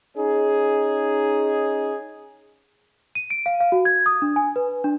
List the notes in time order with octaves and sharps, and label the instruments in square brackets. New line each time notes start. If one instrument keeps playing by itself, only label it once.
[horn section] C#4 D#4 G#4
[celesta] D#7
D7
F5
F5
F#4
G#6
D#6
D4
G#5
B4
D4